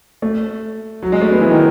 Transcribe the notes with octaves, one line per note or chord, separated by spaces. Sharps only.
A3
F#3
G#3
A3
B3
E3
D#3